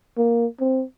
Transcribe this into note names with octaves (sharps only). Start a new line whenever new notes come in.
A#3
C4